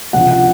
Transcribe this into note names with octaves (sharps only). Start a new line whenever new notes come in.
C#2 C3 F3 F#5
F#5